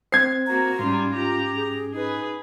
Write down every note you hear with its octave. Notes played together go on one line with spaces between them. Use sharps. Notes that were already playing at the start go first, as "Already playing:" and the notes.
C4 C5 G#6 C7
A#3 F#4 A#5
G#2 G3 C#4 F4
F4 G4 A#5
G#4
D#4 G#4 B4